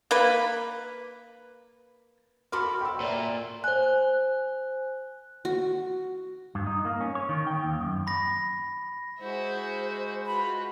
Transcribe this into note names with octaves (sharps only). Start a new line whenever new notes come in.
A#3 B4
F#4 A4 A#4 B5 C6 D6 F6
G5 E6
A#2 D5 E5
C5 G#5 F#6
F#4
G2
D#4
A#3
C#4
C#5
D#3
G5
D#2
F#2
B5 A#6
G#3 E4 F#4 C5
F4 F#4 B4 B5